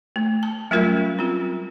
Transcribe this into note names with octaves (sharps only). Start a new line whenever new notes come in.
A3
A5
F#3 G3 A3 C#4 F4 A#4
C4 F4